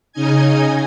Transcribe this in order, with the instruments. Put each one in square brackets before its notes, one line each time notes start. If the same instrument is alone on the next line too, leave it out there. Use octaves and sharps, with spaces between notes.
[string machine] C#3 C#4 D#4 D#5 G#5 G#6